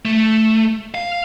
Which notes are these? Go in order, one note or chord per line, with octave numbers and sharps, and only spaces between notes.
A3
F5